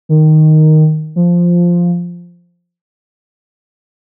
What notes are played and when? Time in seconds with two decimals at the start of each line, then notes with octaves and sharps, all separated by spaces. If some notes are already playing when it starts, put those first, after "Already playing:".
0.09 D#3
1.16 F3